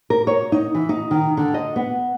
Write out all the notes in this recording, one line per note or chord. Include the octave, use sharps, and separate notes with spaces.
A#4
C#5
D#4
E3
D#4
D#3
D3
D#5
B3